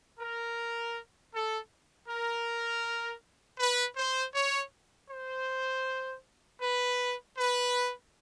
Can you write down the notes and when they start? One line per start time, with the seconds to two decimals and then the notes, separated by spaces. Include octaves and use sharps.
0.19 A#4
1.32 A4
2.08 A#4
3.59 B4
3.96 C5
4.34 C#5
5.10 C5
6.62 B4
7.38 B4